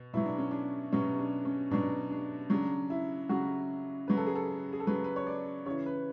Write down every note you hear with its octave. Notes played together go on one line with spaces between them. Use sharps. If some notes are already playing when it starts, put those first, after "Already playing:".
Already playing: B2
B2 F#3 E4
D4
C#4
D4
B2 F#3 C#4
D4
C#4
B2 F#3 D4
D4
C#3 F#3 D4
E4
C#3 F#3 F#4
C#3 F#3 B4
A4
G#4
A4
G#4
A4
C#3 F#3 B4
B4
C#5
D5
C#3 E3 C#5
B4